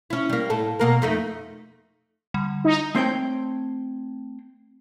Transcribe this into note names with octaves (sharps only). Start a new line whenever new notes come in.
C#4 E4
G3 A#3
A2 A4
B2 A#3 A#4
F2 A3 D#4
D3 G3
D#4
A3 C4 C5 C#5 F#5 G5